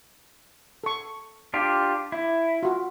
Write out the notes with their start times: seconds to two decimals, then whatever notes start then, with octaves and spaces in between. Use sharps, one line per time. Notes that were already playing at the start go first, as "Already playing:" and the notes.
0.84 A4 C#6
1.54 D4 F4 G4
2.12 E4
2.63 F4 F#4